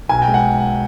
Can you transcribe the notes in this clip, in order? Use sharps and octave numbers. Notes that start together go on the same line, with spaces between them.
B1 G#5
G5
G#3
F#5